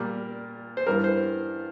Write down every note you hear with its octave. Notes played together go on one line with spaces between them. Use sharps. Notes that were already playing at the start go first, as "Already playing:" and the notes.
Already playing: A#2 G3 A#4
C5
G2 E3 G3 A#4
C5